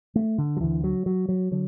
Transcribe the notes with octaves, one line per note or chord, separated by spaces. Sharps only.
A3
D3
F#3
D2 D3 E3
F#3
F#3
F#3
D3 F#3